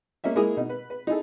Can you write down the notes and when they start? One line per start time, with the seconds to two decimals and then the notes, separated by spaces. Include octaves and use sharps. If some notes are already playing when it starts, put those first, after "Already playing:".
0.24 A#3 C#4 D#5 E5
0.36 G#3 A#3 E4 G#4 A#4 D#6
0.57 B2 D#4
0.69 B4
0.90 B4
1.07 D#4 E4 G#4 A4